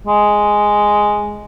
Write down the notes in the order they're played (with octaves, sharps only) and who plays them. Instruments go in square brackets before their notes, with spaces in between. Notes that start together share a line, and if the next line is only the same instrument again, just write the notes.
[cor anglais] G#3